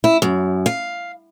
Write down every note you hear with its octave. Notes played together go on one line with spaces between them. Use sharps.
E4
F#2
F5